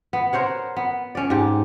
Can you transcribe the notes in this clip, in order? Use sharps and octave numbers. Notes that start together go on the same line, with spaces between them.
B3
A#4 C5 C#5 F#5
B3
C#4 D5
G#2 G4